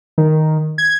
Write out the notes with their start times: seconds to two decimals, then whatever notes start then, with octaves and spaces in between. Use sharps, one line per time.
0.18 D#3
0.78 G#6